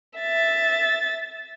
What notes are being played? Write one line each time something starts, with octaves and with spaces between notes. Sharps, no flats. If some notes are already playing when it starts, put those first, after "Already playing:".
E5 A6